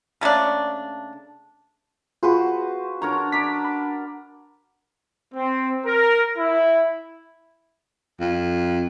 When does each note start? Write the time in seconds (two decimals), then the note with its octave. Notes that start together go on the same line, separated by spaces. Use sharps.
0.21 C#3 A3 A#3 D4
2.23 F4 F#4 G#4 B4 C5
3.02 D4 A#4 C#5 A#5
3.32 D5 A#5 B6
3.65 B5
5.35 C4
5.86 A#4
6.37 E4
8.20 F2